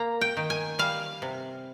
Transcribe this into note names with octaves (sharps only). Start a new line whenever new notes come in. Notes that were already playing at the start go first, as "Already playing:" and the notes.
Already playing: A#3 A#5
G5
D#3
G#5
G3 F5
C3